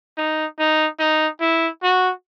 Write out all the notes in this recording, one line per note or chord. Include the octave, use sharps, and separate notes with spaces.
D#4
D#4
D#4
E4
F#4